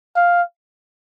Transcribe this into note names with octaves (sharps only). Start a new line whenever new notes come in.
F5